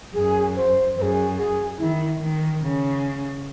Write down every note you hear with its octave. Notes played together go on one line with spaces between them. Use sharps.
F#2 G#4
C5
F#2 C5
G#4
G#4
D#3 E4
D#3
C#3